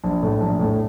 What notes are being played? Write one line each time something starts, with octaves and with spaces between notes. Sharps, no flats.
A#1
A2 A3
A#1
A2 A3